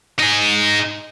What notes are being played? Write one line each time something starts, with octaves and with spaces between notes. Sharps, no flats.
D#4 G#4